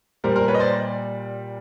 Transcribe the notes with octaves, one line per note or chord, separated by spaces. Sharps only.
A#2 G3 A#4 C5
A#4 C5
B4 C#5
D#5
C5 D5